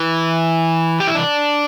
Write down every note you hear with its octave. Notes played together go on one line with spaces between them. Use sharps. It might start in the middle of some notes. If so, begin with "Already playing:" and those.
Already playing: E3
G4
E4
D4